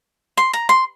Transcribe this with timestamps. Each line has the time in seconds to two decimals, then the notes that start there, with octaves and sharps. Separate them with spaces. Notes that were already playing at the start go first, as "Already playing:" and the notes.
0.37 C6
0.53 A#5
0.69 C6